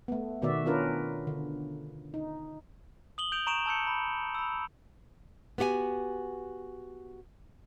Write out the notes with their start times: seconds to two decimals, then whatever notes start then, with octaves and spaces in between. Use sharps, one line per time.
0.08 A3 B3
0.42 B2 D#3 B3 F#4 D5 E5
0.66 C#4 D4 F4 A#4 B4
1.27 D3
2.14 D#4
3.18 D#6 F#7 G7
3.32 D#6 G6 D7 F7
3.47 A#5 C#6 D7 E7 F7
3.66 A5 E6 G6 C#7
3.87 B5
4.35 B5 E6
5.58 B3 F#4 G4 F#5 G#5